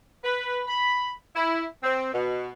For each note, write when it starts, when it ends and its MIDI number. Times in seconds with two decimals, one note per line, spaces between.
0.24 0.60 71
0.68 1.11 83
1.35 1.65 64
1.83 2.10 60
2.13 2.51 47